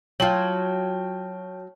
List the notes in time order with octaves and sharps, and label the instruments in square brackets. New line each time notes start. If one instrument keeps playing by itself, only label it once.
[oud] F#3 F4 [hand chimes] C#5 A5 F6 [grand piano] G5 F#7